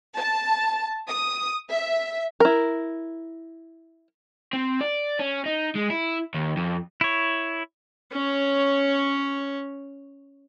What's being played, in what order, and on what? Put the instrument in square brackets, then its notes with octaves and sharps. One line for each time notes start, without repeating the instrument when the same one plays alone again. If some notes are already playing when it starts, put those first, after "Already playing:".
[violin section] A5
D#6
E5
[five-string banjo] E4 A#4
[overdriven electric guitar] C4
D5
C#4
D#4
G#3
E4
D#2
F2
[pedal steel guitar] E4 C#5
[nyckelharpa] C#4 C#5